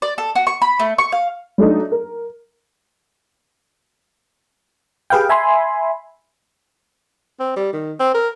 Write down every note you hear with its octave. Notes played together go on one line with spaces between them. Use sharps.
D5
A4
F#4
C#6
B5
A3
C#6
F5
F#3 A3 D4 D#4
A#4
G4 G#4 B4 F5 G5
E5 G#5 B5 C6
C4
G3
D#3
C4
A#4